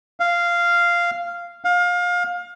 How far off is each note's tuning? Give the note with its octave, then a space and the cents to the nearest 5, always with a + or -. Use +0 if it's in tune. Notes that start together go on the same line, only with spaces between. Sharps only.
F5 -10
F5 +25